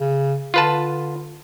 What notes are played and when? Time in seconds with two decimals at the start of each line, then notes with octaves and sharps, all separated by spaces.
0.01 C#3
0.54 D3 F4 B4 A5